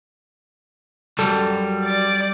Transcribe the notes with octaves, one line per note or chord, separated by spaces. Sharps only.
B1 F#2 G3 A4
D5